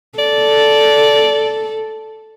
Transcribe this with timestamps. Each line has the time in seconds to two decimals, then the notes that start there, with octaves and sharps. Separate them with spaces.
0.19 A4 D5